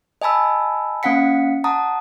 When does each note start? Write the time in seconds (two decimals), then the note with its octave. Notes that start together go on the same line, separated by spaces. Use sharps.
0.22 D#5 G#5 A5 B5 E6
1.03 A#3 C#4 F5 F#5 B6 C#7
1.64 F#5 A5 A#5 D#6